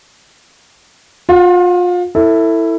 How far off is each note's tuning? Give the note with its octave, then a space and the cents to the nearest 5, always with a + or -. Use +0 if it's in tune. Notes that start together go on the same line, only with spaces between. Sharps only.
F4 +30 F#5 +0
E4 +0 A4 +25